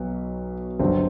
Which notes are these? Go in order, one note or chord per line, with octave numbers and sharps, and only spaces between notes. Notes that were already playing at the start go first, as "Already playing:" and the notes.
Already playing: B1 B2 F#3 B3
G1 G2 D3 F#3 C4